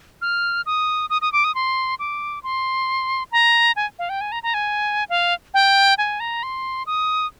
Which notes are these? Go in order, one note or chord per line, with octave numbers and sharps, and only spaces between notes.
F6
D#6
D#6
D#6
D6
D#6
C6
D6
C6
A#5
G#5
F5
G5
G#5
A#5
A#5
G#5
F5
G5
G#5
A#5
C6
D#6